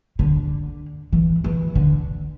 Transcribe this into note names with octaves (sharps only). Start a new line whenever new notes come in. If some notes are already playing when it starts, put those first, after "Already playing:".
D3
E3
E3
D3